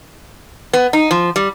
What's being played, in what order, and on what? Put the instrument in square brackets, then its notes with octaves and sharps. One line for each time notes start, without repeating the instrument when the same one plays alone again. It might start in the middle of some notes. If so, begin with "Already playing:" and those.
[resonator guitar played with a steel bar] B3
D#4
F3
G3